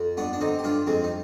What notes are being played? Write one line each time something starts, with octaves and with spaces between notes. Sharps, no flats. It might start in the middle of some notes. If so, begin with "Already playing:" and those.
Already playing: F2
G2 B3 D4
D4
D3 C4 D#4
G4
G2 D4 F4
F2 G#3 C4
D#4